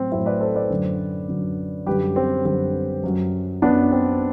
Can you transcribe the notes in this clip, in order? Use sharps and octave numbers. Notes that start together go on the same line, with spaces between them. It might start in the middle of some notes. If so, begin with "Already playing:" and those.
Already playing: A2 F#3 C4
A2 F#3 C4 E4
B4 D5
A4 C5
B4 D5
F#2 D3 F#3
F#2 D3 F#3
F#2 D3 G3 G4 B4
C4
F#2 D3 G3 C4
F#2 F#3
F#2 F#3 B3 D4
C4